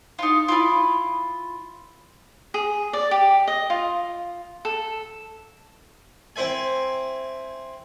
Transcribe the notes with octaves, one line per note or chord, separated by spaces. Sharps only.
D#4 F4
E4 F4
G#4
D5
G4
D#5
F4
A4
C4 E4 C5 E5 G#5